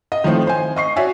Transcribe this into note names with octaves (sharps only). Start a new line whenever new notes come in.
D#5
D#3 F3 A3 C4 E4
C5 G#5
D#5 C#6 C7
F#4 C#5 D5 E5 G#5